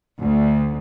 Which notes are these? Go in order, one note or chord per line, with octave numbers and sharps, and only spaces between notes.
D2